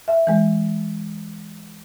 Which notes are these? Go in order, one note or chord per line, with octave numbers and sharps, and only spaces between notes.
E5
E3 G#3